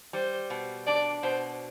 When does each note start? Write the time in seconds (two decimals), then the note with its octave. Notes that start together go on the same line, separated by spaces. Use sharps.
0.13 G3 C5
0.50 B2
0.87 D4 D5
1.23 B2 C5